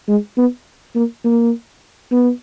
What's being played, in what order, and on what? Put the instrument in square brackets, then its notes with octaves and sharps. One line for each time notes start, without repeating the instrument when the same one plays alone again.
[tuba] G#3
B3
A#3
A#3
B3